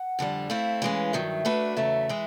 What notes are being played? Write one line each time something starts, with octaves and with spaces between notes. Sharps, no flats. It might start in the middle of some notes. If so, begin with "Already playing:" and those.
Already playing: F#5
F2 D3 G3
A3 C4 E4 F5
E3 G#3 C#4
G2 D#3 F#3 E5
A3 D4 F#4 B4
E2 C#3 F#3 A3 E5
E3 G#3